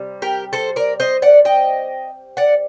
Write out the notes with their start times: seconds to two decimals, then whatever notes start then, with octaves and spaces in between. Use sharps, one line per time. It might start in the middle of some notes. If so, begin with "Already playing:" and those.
Already playing: C3 G3
0.22 G4 A#4
0.53 A4 C5
0.76 A#4 D5
1.00 C5 D#5
1.22 D5 F#5
1.45 D#5 G5
2.37 D5 F#5